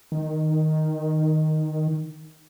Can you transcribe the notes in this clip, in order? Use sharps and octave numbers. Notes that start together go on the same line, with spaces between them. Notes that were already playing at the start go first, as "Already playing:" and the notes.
D#3